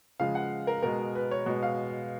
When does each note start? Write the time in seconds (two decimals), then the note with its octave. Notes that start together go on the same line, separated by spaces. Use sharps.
0.20 C#3 F3 G#3 F5
0.35 F#5
0.67 A#4
0.83 B2 G#3 A#4
1.15 B4
1.31 C#5
1.46 B2 G#3
1.63 F5